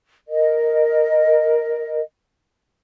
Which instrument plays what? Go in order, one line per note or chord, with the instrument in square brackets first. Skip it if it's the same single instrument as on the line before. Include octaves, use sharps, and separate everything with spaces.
[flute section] A#4 D#5